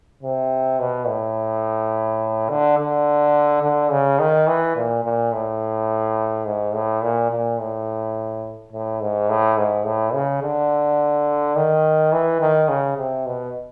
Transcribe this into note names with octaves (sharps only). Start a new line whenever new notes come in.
C3
B2
A2
D3
D3
D3
C#3
D#3
E3
A#2
A#2
A2
G#2
A2
A#2
A#2
A2
A2
G#2
A2
G#2
A2
C#3
D3
D#3
E3
D#3
C#3
C3
B2